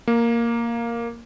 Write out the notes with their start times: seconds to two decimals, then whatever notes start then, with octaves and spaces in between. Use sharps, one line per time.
0.08 A#3